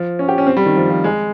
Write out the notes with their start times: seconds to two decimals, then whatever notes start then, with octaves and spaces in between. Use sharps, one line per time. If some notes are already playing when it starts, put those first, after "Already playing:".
Already playing: F3
0.19 C#4
0.29 G4
0.38 C#4
0.47 C4
0.57 G3
0.66 D#3
0.76 F3
0.90 F3
1.04 G#3